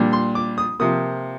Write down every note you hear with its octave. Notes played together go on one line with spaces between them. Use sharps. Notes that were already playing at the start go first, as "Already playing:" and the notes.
Already playing: A#2 G3 D4
C6
D6
D#6
C3 F3 A#3 D#6